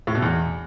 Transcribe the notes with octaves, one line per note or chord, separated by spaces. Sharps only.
A2
B2
E2